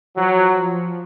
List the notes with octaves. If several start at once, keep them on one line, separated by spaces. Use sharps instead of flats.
F3 F#3